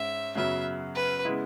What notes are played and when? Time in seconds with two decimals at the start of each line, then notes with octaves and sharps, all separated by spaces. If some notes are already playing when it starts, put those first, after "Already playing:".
Already playing: G#2 C#4 E5
0.35 F#2 C#3 F#3 B3 E5
0.95 B4
1.25 C#3 G#3 B3 E4